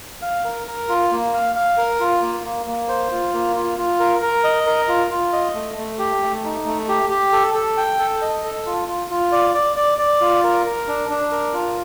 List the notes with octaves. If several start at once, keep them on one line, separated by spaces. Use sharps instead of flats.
F5
A#4
A#4
F4
A#3
F5
F5
A#4
F4
A#3
A#3
A#3
C5
F4
A#3
F4
F4
A#4
A#4
D#5
A#4
F4
F4
D#5
A3
A3
G4
A3
D#4
A3
G4
G4
A4
A4
G5
A4
D#5
A4
F4
F4
F4
D5
D5
D5
D5
F4
A#4
A#4
D4
D4
A#4
F4